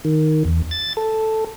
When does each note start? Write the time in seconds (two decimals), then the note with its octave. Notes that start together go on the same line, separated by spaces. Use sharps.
0.05 D#3
0.45 E2
0.71 A6
0.97 A4